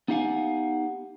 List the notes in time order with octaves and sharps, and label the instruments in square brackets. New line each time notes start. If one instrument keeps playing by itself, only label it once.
[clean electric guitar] B3 D#4 G4 F5 F#5 G#5